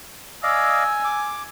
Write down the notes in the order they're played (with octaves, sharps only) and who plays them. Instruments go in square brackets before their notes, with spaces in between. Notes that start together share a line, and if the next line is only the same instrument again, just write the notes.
[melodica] D5 D#5 F5 [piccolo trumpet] G#5 [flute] E6
[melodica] D6